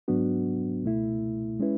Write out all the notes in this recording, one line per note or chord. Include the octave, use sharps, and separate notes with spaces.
G#2 F#3 B3 D4 F#4
C#2 B2 A3 E4
G#3 C#4 E4 B4